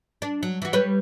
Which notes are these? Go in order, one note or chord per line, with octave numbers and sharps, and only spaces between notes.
D4
F#3
E3 F#4
G3 B4 C#5